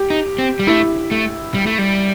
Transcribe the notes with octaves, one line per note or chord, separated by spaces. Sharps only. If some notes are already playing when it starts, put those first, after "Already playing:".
Already playing: G4
D#4
C4
G3
A3 E4
A3
G3
A3
G3